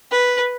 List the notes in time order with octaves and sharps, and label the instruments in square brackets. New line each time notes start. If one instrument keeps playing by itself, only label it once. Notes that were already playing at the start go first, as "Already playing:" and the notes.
[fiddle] B4